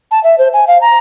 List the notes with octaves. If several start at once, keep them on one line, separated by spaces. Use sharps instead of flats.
A5
E5
C5
G#5
F5
A#5